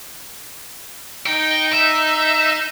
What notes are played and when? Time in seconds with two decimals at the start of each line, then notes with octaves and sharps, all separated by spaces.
1.27 D#4 D#5 G5
1.73 E5